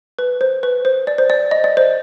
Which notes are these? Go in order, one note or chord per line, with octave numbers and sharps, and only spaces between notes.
B4
C5
B4
C5
D5
C5
D5
D#5
D5
C5